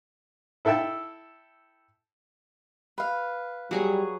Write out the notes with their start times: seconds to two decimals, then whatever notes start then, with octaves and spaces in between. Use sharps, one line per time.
0.65 E4 A4 E5 G5 A5
2.98 B4 F5
3.71 F#3 G3 G#4 C#5